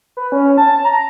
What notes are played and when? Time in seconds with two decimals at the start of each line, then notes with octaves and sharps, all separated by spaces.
0.17 B4
0.32 C#4
0.58 A5
0.85 A#5